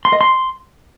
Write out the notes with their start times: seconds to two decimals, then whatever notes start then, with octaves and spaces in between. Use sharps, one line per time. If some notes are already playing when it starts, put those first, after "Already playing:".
0.05 C6
0.13 D#5
0.21 C6